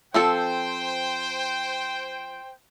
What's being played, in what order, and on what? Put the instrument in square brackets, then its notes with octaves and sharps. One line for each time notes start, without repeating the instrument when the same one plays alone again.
[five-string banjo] F3 C4 A4 [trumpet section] C5 G5